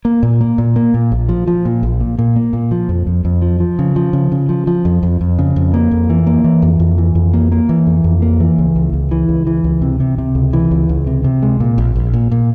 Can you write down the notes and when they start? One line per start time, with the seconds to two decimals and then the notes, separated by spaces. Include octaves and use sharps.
0.05 A#3
0.23 A#2
0.41 A#3
0.58 A#2
0.76 A#3
0.94 A#2
1.12 A#1
1.29 F3
1.47 F3
1.65 A#2
1.83 A#1
2.01 A#2
2.19 A#2
2.36 A#3
2.53 A#2
2.71 F3
2.89 F2
3.07 F2
3.25 F2
3.42 F3
3.60 F3
3.79 C#3
3.96 F3
4.13 C#3
4.32 C#3
4.49 F3
4.67 F3
4.85 F2
5.03 F2
5.21 F2
5.39 C#3
5.56 F2
5.74 A#3
5.91 F2
6.10 E3
6.27 A#3
6.44 E3
6.62 F2
6.80 F2
6.98 E3
7.15 F2
7.33 A#3
7.52 A#3
7.69 E3
7.87 F2
8.04 F2
8.22 A#3
8.40 E3
8.58 C#2
8.76 C#2
8.93 C#2
9.11 E3
9.29 C#2
9.47 E3
9.64 C#2
9.82 C3
10.00 C3
10.18 C3
10.35 C#2
10.53 E3
10.71 C#2
10.89 C#2
11.07 C3
11.24 C3
11.42 G#3
11.60 A#2
11.78 A#1
11.96 A#1
12.13 A#2
12.31 A#2